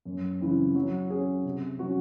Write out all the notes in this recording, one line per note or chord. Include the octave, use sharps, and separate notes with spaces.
F#2
C#3 E3 C4
F#3
C#4 G#4
C3
F#3 C#4 F#4